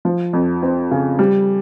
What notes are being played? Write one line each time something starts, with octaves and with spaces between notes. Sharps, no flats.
F3
F2
C4
C#3
G3